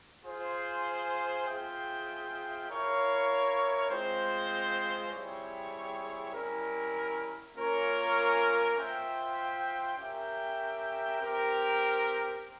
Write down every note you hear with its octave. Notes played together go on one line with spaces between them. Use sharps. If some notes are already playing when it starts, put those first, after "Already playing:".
F4 G#4 C5
C4 F4 G#4 E5 G5
E4 A#4 C#5 F5
G#3 C4 F4 C5
G3 C4 E4 G#4 C#5
G3 C#4 E4 A#4
A#3 C#4 F4 A#4 C#5
F4 C5 E5 G5
C#4 G4 A#4 E5 G5
C4 G4 A#4